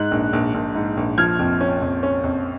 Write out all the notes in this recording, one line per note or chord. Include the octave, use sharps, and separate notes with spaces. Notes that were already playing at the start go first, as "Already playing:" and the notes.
Already playing: G#2 F#6
A#1
A#1
A#1
G#2
A#1
F3 F6 G#6
F2
C#4
F2
C#4
F2